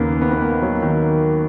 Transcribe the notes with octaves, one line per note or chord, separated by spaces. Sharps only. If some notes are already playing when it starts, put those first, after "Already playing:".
Already playing: D#2 C#3 A#3 B3
B3
B3
A#3
F#3
D#3